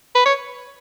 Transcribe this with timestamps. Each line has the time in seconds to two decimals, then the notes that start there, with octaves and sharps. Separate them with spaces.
0.15 B4
0.25 C#5